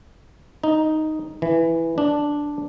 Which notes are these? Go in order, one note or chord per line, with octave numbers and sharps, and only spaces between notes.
D#4
E3
D4